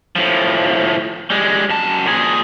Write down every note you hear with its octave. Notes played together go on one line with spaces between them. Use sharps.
A2 F3
G3 G#3
F#2 A5
A#2 G#4